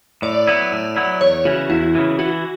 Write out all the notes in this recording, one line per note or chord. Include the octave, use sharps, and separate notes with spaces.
A2 D5
F#3 B3 E4
A2
F#3 B3 E4
E2 C#5
C#3 E3 F#4
E2 E4
C#3 E3
E3 F#4